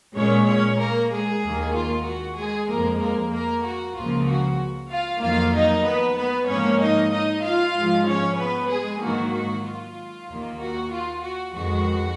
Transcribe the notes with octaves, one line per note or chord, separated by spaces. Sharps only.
A#2 G#3 C#4 C#5
C#4 C#5
A#3 A#4
G#3 G#4
D#2 D#3 A#3
F4
F#4
G#3 G#4
F2 F3 G#3 A#3 A#4
A#3 A#4
A#3 A#4
F#4
C#2 C#3 F3 A#3 F4
F#4
F4 F5
F2 D#3 F#3 A#3 F4 F5
D#4 D#5
B3 B4
B3 B4
G#2 F3 A#3 C#4 C#5
D#4 D#5
D#4 D#5
F4 F5
G#2 F3 G#3
C#4 C#5
B3 B4
G#3 G#4
G#2 D#3 F#3 A#3 F#4
F#4
F4
D#2 D#3 A#3
F#4
F4
F#4
F2 D#3 G#3 F#4